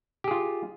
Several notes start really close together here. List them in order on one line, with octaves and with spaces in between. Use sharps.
G4 G#4 F4